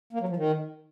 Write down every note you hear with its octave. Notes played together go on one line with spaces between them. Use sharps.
A#3
F#3
F3
D#3